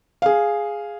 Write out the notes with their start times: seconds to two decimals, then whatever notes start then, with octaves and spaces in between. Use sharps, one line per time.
0.22 G#4 F5